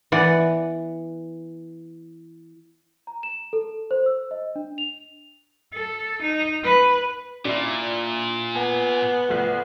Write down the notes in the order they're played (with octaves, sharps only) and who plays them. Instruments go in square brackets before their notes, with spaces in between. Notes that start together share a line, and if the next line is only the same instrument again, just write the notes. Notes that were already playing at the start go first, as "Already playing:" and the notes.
[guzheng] E3 B3 B4 D5 F#5
[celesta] A#5
E7
A4
C5
E6
D#5
D4
F7
[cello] A4
D#4
B4
[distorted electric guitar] A#2 [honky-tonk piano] D4 E4
[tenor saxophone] B3 [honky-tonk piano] G#5
[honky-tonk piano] C2 F3 A3